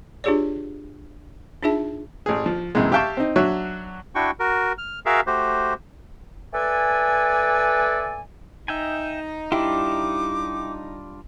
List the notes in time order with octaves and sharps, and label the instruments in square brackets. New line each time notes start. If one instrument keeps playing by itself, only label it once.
[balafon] D4 F4 G4 G#4 C#5 D5
D4 D#4 F4 G#4 E5 A5
[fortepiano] A1 G#4
F3
B1 F#2 C3 E3 G#3
G4 E5 F5 G5 A5 C#6
C4 D#4
F#3 D4 F#4 C#5 E5
[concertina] D4 E4 F#4 G5 C#6
F#4 A#4
F6
F#4 G#4 A#4 E5 F5
A3 F#4 G4 C5
[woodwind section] A3 A4 B4 D5 G#5
[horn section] D#4 [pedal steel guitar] E5 G5 G#5
[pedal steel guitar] G3 D4 F4 [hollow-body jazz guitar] E4 G4 [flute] D6